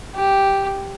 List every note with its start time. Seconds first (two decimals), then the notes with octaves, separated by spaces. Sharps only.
0.16 G4